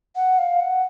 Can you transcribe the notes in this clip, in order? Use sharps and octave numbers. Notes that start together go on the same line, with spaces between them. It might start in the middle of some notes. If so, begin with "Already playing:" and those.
F#5
F5
F#5